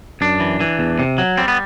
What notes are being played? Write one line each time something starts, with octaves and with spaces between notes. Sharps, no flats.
F#2 D4
E3
E3
E2
C3
F#3
G3 C4
B3